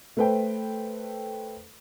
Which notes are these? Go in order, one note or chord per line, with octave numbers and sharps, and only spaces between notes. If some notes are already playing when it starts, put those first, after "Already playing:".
A3 A4 B4 C5 G5